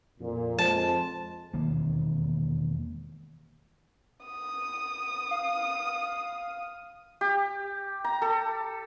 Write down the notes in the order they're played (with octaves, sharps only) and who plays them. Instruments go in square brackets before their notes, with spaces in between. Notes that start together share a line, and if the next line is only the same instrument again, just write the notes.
[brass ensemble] F2 A#2
[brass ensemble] F2 G#3 C5 [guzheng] A5
[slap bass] E1 D#3 A#3 C4
[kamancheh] D#6
[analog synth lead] F5
[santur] G4
A#5
A4